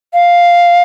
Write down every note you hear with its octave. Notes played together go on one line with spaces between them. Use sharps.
F5